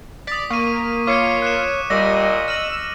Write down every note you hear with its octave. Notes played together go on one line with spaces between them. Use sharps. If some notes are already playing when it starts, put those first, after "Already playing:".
D5 D#6 B6
A#3 C#6 D#7
F4 C#5 D6 C#7 D#7
F#6 C#7 E7
A#2 G3 D#5 E6 A#6
E6 F6 D#7 F#7